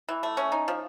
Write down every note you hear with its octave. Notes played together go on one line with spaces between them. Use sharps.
E3
A3
C#4
D#4
F3